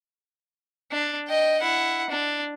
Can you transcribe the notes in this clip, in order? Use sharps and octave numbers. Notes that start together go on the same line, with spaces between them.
D4
D#5 G5
E4 F#5
D4